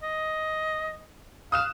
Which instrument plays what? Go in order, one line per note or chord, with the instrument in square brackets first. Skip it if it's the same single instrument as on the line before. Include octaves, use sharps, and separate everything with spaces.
[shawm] D#5
[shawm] F5 [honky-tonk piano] D#6 F#6 E7